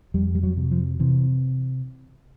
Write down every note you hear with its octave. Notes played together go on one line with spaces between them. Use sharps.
F2 G3
G3
F#3
C3
F3
C3 E3